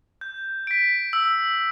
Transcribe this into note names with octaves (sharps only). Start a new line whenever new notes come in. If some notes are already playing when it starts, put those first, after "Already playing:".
G6
B6 D7
E6